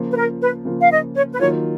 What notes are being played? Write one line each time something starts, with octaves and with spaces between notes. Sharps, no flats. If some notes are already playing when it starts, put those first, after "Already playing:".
Already playing: C#3 F3 A#3 F4
B4
A#4
B4
C#3 F3 A#3 F4
F5
D#5
C#5
B4
D#3 F#3 A#3 F4 C#5